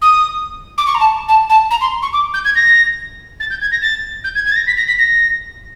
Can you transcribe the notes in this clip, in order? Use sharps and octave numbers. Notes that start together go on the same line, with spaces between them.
D#6
D6
C#6
A#5
A5
A5
A5
A#5
C6
C#6
D6
G6
G#6
A#6
A6
G6
G#6
A#6
A6
G6
G#6
G#6
A6
A#6
B6
A#6
B6
A#6